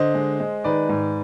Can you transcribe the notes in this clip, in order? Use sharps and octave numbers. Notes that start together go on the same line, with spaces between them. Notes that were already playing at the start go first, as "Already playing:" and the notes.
Already playing: D3 C5 D#5
G#3
G#3
D#3 B4 D5
G#2